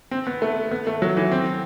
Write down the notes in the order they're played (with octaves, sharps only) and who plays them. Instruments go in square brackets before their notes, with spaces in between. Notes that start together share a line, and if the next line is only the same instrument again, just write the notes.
[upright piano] C4
B3
A3
B3
A3
F#3
E3
C4